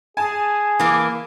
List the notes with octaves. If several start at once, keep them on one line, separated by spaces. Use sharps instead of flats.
G#4 G#5 A5
E3 A#3